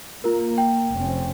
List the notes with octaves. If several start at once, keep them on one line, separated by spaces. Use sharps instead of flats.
A#3 F4 A#4
G5
F1 C4 C#4